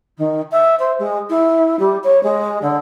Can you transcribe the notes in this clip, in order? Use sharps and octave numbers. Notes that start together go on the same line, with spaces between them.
D#3
E5
C5
G#3
E4
G3
C#5
G#3
D3